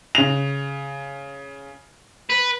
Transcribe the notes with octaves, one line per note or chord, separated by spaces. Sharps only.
C#3 F7
B4